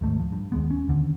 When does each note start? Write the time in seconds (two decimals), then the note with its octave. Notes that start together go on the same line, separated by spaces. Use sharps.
0.01 D#2 G#2 A3
0.19 F3
0.32 G2
0.52 D#2 G#3 B3
0.70 C#4
0.88 D#2 D3